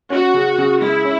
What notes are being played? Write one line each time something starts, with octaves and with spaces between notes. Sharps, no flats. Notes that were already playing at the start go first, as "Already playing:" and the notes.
C#4 F#4
C#3
C#3
G#3 E4
C#4